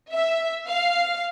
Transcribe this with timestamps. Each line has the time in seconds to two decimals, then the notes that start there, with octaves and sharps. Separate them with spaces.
0.14 E5
0.68 F5